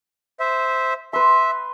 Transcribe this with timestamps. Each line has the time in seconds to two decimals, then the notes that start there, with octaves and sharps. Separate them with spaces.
0.40 C5 E5
1.13 B4 E5 C6